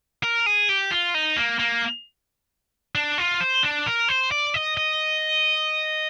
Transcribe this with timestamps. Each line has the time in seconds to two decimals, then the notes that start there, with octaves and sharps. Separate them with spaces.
0.23 A#4
0.46 G#4
0.69 G4
0.91 F4
1.14 D#4
1.37 A#3
1.59 A#3
2.95 D4
3.18 F4
3.41 C5
3.63 D4
3.86 A#4
4.08 C5
4.31 D5
4.54 D#5
4.77 D#5